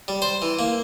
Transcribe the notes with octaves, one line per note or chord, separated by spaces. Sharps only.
G3
C5
E3
A#3